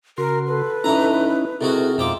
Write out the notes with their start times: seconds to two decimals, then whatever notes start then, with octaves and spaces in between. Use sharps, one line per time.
0.18 C#3 F#4 A#4 C6
0.46 A4 B4
0.84 G2 E3 C#4 D#4 E4 A#5
1.61 C3 G#3 E4 F#4 A4 A#4
1.98 F2 G#2 B2 F4 E5 G5 D6